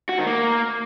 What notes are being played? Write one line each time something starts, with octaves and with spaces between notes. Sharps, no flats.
F#4
D#3
A#3